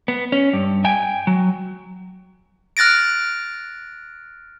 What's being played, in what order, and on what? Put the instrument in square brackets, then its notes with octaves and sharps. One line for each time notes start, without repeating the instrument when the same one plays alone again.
[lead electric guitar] B3
C#4
G2
G5 G#5
F#3
[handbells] F6 F#6 A6 A#6 D7